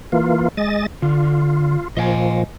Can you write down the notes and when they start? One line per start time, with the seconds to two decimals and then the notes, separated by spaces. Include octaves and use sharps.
0.12 E3 A#3 F4
0.57 G#3 D#5 A6
1.02 D3 F4
1.97 A#2 F3 D#5 F5 G#5